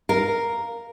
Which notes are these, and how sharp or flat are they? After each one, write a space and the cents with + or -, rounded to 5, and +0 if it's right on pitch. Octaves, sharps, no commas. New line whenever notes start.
A#4 +0 F5 +0